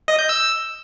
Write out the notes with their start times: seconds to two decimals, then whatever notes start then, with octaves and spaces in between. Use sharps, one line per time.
0.08 D#5
0.19 G6
0.29 E6